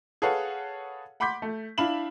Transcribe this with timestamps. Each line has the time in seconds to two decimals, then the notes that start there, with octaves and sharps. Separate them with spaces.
0.22 G#4 A4 B4 C#5 F5 F#5
1.20 F#5 B5 C6 D6 G6 B6
1.42 A3
1.78 D4 E4 F5 B5 E7 F#7